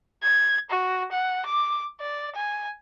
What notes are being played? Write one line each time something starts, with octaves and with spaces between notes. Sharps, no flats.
G#6
F#4
F#5
D6
D5
G#5